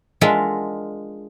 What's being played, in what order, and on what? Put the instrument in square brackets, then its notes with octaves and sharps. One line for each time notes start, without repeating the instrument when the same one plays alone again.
[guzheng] G#3 D4 F4 A#4 E5 F#5